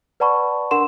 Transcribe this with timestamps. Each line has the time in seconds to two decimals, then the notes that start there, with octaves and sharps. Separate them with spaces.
0.20 B4 D5 F#5 A5 B5 C#6
0.71 D4 A#4 F#5 C6 E7